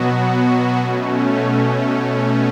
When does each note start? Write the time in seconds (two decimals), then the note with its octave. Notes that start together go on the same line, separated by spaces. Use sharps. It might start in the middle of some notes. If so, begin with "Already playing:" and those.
Already playing: B2 F#3 B3 F#4
0.77 B2 A3 C#4